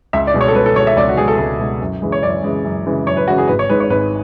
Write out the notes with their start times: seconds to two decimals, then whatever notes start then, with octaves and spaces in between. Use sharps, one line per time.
0.13 C#2 E5
0.27 D5
0.34 B2 G#3
0.41 C#5
0.48 A4
0.55 C#2 B4
0.66 A4
0.76 B2 G#3 C#5
0.87 E5
0.97 C#2 D5
1.09 F#4
1.17 B2 G#3 G#4
1.28 A4
1.38 C#2 A4
1.59 B2 G#3
1.81 F#2
2.02 C#3 E3 G#3
2.12 C#5
2.22 F#2 D5
2.43 C#3 E3 G#3
2.64 F#2
2.86 C#3 E3 G#3
3.06 F#2 C#5
3.17 B4
3.28 C#3 E3 G#3 F#4
3.38 G#4
3.48 G#1 B4
3.59 C#5
3.69 G#2 G#3 B4
3.80 C#5
3.90 G#1 B4